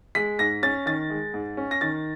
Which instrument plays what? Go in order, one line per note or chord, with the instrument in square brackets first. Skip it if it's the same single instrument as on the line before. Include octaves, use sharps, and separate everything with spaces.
[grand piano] G#3 B6
G#2 A#6
C#4 A6
D#3 A6
G#3
G#2
C#4
A#6
D#3 A6